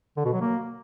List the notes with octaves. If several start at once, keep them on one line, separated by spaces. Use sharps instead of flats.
D3
B2
F#3
A#3